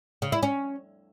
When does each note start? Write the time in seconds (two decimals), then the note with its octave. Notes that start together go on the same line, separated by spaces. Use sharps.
0.22 C#3
0.32 E4
0.43 C#4